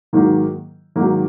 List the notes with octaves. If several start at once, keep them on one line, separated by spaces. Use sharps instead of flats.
G#2 D#3 F#3 A#3
G#2 D#3 F#3 A#3